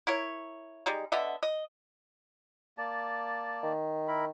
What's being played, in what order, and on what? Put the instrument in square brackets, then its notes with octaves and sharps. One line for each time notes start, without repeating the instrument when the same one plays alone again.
[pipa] E4 A#4 C#5
G3 G#3 D#4
D3 B3 D#5 E5
D#5
[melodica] A#3 D5 A5
[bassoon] D#3
[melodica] E4 A#4 B5